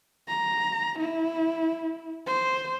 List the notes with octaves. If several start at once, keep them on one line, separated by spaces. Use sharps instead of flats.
A#5
E4
C5